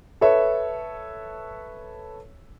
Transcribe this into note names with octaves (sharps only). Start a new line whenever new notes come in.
A4 B4 C#5 E5